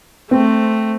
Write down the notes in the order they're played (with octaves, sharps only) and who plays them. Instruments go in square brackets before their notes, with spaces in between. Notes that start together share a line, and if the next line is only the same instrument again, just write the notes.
[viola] A3 [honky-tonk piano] C4